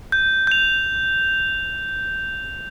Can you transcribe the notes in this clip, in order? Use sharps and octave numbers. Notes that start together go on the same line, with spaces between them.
G6
G6 F7